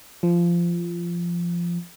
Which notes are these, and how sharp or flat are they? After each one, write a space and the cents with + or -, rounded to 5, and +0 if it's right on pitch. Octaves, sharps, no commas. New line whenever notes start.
F3 -15